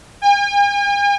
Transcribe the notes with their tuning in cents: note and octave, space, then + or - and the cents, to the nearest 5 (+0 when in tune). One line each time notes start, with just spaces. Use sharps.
G#5 -45